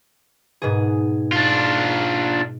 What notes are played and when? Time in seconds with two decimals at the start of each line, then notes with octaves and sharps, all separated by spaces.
0.62 G#2 B2 G#4
1.32 D4 F4